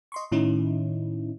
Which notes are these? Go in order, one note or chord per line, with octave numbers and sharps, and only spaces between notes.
D#5 C6 C#6
A2 D#3 C#4 D#4 E4